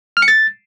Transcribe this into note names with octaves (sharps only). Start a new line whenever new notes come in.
F6
C#7
A6